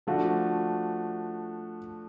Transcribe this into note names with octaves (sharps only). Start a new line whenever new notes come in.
F3 A3 D4 F#4